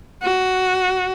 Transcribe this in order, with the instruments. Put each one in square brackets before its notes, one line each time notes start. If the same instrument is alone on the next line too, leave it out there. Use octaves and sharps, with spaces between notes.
[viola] F#4